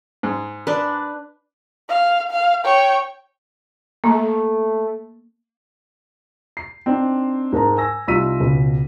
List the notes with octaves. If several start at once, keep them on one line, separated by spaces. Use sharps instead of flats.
G#2
D4 B4
F5
F5
C#5 G5
A3 A#3
C7
C4 D4 D#4
G#2 A#4 A5 A#5
G#5 E6 A#6
C2 D#4 F4 E6 B6 D#7
C#2 B2